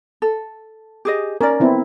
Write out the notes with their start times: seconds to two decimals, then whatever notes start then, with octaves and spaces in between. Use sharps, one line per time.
0.22 A4
1.05 G4 G#4 D#5
1.41 C#4 A#4 D5
1.60 B3 C4 E4